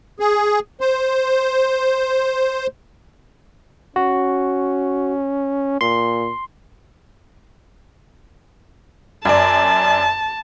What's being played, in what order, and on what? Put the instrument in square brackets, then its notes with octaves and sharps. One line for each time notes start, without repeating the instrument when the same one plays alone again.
[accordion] G#4
C5
[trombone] C#4 [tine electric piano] F#4
[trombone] A#2 [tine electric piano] C6
[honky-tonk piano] F#2 D5 [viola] A5